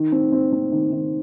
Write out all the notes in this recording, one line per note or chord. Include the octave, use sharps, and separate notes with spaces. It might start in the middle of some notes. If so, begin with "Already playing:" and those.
Already playing: D#3
C4
C4
C4
D#3
D#3